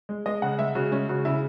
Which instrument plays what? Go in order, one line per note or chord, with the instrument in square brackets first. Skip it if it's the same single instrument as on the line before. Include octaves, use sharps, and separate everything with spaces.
[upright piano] G#3
G#3 D#5
C#3 F#5
G#3 E5
C#3 F#4
G#3 C#4
C#3 F#4
C#3 E4